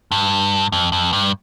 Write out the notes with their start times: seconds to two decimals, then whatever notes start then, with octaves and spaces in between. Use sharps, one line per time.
0.11 G2
0.72 F2
0.92 F2
1.13 G2